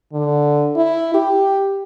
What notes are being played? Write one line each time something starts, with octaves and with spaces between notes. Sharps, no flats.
D3
E4
G4